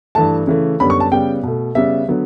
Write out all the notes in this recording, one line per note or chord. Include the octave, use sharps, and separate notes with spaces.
G2 E3 A3 A5
C#3 E3 A3
F#2 D3 G3 B3 B5
C#6
A5
C#3 G3 B3 G5
B2 A3
C#3 G3 B3 E5
D3 F#3 B3